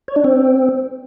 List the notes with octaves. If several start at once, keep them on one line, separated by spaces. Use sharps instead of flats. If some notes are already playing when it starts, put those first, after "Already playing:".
C#5
D4
C4